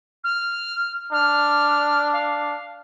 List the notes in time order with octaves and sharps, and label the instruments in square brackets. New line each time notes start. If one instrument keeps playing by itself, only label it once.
[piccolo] F6
[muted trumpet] D4 [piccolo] F6
[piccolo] F5